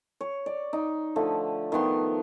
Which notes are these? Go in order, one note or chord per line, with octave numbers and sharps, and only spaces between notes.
C#5
D5
D#4
D3 F3 A3
D#3 F3 B3 C6